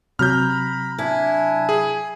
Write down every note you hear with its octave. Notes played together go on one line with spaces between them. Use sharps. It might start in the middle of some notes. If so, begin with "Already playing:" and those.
C3 F#3 A#5 B5 F6 G6
D4 E4 G#5
G#4 G#5